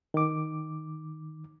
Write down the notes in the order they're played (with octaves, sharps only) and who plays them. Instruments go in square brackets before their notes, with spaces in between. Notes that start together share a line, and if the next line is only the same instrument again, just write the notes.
[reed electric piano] D#3 D6